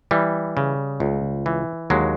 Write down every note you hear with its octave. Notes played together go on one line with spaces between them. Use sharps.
E3 G3
C#3
C#2
E3
D#2 F#3 G#3